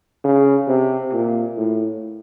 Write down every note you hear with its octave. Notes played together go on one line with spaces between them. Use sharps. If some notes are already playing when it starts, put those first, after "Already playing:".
C#3
C3
A#2
A2